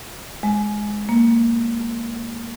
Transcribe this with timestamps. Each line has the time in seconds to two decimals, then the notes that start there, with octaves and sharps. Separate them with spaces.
0.43 G#3
1.09 A#3